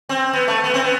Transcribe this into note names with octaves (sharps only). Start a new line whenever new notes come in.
C4
B3
A3
B3
C4
B3